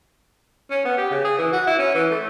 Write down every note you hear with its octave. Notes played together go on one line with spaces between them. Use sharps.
C#4
B3
G4
C#3
G#4
E3
F#4
E4
C#4
E3
A3